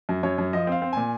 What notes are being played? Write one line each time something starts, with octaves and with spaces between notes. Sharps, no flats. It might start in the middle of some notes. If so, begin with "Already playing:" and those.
F#2
F#2 C#5
F#2
F3 D#5
C4 F5
C4
A#2 G#5